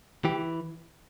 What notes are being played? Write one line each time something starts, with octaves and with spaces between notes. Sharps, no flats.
E3 G4